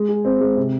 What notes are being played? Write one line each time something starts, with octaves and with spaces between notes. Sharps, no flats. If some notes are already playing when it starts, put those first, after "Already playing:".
Already playing: G#3
G#4
C4
G#3
C3